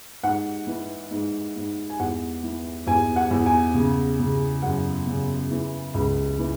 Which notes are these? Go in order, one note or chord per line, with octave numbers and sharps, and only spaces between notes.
G#2 F#5
E3
G#2
G#2
G#5
E2 F#5
E3
E2 G#5
F#5
E2
G#5
C#3
C#3
F#2 F#5
C#3
E3
C#2
E3